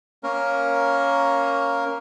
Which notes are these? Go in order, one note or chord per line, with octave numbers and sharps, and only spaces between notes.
A#3 C#4 A#4